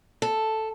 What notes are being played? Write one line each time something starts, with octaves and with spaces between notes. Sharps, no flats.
A4